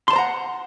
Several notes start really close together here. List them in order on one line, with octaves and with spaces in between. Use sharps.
C6 A5 C5 A#5 F#5